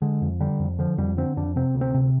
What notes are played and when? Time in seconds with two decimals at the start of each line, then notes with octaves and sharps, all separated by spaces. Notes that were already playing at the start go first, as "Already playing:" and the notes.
0.02 D3 G#3
0.22 F2
0.40 D3 G3
0.60 F2
0.79 D3 F3
0.98 F2 G3
1.17 D3 C4
1.37 F2 D4
1.56 C3 C4
1.75 D2
1.81 C4
1.94 C3